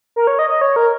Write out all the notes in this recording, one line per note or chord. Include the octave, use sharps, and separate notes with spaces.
A#4
C#5
D#5
D#5
C#5
A#4